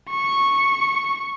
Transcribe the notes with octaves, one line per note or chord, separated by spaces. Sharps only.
C#6